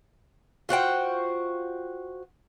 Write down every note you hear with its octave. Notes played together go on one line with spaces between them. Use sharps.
F4 F#4 C5 G5